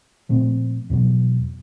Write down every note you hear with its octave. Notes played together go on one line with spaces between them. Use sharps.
A#2 F3 A3 C4
E2 B2 F#3